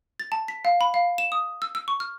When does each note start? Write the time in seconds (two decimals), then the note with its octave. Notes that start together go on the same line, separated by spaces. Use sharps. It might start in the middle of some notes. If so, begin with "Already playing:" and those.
0.20 A6
0.32 A5
0.48 B6
0.65 F5
0.81 B5
0.94 F5
1.18 E7
1.32 D#6
1.62 E6
1.75 E6
1.88 C#6
2.00 F6